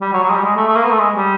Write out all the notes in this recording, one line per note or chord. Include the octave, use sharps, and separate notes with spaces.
G3
F#3
F#3
G#3
G3
G#3
A3
A3
A#3
B3
A3
G#3
G3